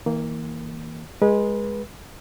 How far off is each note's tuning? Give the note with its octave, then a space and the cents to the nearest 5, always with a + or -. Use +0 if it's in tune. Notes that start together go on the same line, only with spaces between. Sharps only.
E3 -45 A#3 -5
G#3 -5 B4 -30